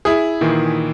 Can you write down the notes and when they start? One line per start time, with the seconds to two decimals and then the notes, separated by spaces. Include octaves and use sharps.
0.05 E4 G#4
0.41 A#2 D#3 E3